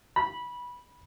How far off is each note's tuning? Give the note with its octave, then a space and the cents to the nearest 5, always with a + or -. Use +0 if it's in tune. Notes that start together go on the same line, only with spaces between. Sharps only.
B5 -15